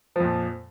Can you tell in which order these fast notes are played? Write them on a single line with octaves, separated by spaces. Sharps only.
F3 F2 A#2